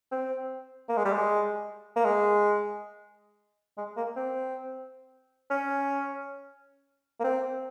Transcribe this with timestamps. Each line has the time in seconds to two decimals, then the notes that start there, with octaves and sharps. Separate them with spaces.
0.12 C4
0.89 A#3
0.97 G#3
1.05 G3
1.13 G#3
1.96 A#3
2.05 G#3
3.77 G#3
3.97 A#3
4.16 C4
5.50 C#4
7.20 A#3
7.24 C4